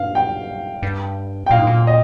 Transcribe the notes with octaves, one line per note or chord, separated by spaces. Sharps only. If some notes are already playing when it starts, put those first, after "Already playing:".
Already playing: G2 F5
G5
G2
G5
A#2 F5
G#2
A#2
D#5